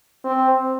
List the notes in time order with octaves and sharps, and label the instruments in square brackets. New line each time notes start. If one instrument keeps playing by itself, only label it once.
[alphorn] C4